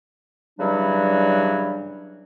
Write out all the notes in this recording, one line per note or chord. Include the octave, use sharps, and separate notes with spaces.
G2 C#3 E3 F#3 G3 D4